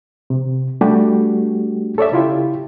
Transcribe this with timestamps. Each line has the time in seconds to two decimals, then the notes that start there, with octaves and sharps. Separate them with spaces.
0.30 C3
0.81 G3 A3 D4 F#4 G4
1.98 A4 C#5 D5 E5
2.12 C#3 E4 F4 G4